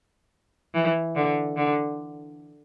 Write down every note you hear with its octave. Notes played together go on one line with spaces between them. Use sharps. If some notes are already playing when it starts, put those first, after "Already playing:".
E3
D3
D3